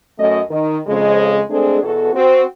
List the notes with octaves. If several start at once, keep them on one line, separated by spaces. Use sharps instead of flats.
F#2 A3 D#5
D#3
F2 C#3 G#3
G#3 A3 C4 D4 G#4 A4
E2 B2 F#4 A4
C4 F#4